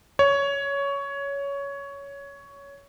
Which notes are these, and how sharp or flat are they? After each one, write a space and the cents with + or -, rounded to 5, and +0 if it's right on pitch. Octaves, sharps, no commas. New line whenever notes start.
C#5 +15